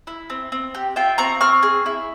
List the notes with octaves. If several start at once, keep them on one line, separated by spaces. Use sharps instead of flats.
E4
C4
C4
G4
F4 E5 G5
C4 A#5 C#6
C4 C#6 F6
G#4
E4